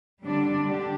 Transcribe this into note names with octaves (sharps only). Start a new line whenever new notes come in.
D3 G3 D4
D3 D4 G4